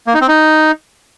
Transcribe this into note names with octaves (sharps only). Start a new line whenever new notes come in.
A#3
D#4
C4
D#4